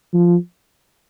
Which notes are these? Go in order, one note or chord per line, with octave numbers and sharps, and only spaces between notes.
F3